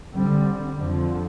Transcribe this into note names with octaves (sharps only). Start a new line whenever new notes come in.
D3 G3 C4
F2 D3 F3